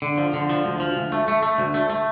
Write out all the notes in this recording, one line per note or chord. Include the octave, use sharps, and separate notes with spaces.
D3
F3
D3
F3
D2
F3
D2
A3
A3
A3
D2
A3
A3